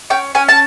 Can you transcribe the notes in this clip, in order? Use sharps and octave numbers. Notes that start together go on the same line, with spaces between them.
C#4 G5
C#4 G#5
A5